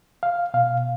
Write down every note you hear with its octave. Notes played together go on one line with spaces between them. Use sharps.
F5
B2 F5